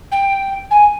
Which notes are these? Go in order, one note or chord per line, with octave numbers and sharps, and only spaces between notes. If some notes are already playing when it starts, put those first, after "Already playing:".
G5
G#5